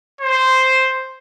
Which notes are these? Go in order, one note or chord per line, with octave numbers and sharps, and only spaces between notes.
C5